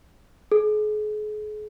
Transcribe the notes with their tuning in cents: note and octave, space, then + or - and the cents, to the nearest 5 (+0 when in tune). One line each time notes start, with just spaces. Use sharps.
G#4 +40